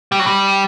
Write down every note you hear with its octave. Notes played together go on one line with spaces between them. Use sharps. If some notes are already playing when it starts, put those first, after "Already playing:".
G3
F#3
G3